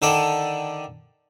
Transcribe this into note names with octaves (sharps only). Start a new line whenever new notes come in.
D3 D#3 A4 D5 G5